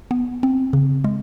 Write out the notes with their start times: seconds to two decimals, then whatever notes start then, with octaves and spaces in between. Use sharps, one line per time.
0.11 B3
0.43 C4
0.73 C#3
1.04 G#3